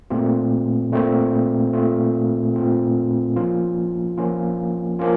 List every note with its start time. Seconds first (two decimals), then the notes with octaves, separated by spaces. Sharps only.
0.10 A#2 A3 C4 F4
0.92 A#2 A3 C4 F4
1.73 A#2 A3 C4 F4
2.55 A#2 A3 C4 F4
3.36 F3 A#3 C#4 F4
4.18 F3 A#3 C#4 F4
4.99 F3 A#3 C#4 F4